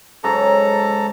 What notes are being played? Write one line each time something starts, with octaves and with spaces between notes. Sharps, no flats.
G#2 C#3 F#3 A4 A#5